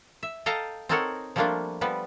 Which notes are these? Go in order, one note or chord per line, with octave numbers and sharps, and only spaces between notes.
E5
A4 D#5 F5 G5 A5 A#5
C4 D#4 A4 A#4 C#5 F#5
F3 G3 A3 A#3 D4 F4
F3 G3 B3 B4